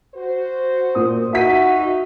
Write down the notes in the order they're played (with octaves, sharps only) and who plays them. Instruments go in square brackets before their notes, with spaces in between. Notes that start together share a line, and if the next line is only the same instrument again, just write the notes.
[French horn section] F#4 C5
[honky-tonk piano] A#2 A#3 D#6
[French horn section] D#4 [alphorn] F#4 [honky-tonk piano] E5 B6 D#7